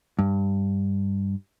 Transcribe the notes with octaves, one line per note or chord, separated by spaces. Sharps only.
G2